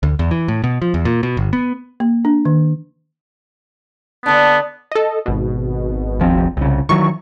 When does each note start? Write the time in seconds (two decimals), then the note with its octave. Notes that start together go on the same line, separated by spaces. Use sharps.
0.03 D2
0.19 E2
0.31 E3
0.48 A2
0.64 B2
0.82 F3
0.94 E2
1.05 A#2
1.23 B2
1.37 G1
1.53 B3
2.00 A#3
2.25 D4
2.45 D#3
4.26 D3 B3 D4
4.92 A4 D#5
5.26 G#1 B2
6.20 E1 F3 C4
6.57 C2 C#3
6.89 D#3 E3 F#3 C#6